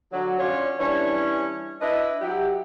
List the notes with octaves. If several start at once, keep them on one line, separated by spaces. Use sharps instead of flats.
D3 F#3
C#4 D4 F4 C#5
E3 G3 C#4 D4 C#5
D4 E4 B4 D#5
F#3 E4 G4